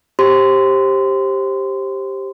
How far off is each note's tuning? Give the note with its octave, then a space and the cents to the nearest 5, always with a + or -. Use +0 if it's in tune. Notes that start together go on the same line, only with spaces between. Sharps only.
G4 +0 C5 +25 C6 -25